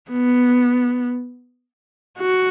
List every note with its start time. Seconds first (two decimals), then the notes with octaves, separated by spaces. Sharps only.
0.10 B3
2.20 F#4